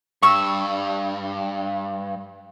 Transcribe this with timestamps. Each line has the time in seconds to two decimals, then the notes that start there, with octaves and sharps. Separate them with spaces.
0.22 G2 C#6 E6